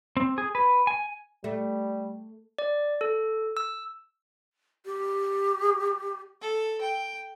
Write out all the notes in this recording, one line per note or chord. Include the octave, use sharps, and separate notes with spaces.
C4
G#4
B4
G#5
G3 A3
D5
A4
E6
G4
A4
G5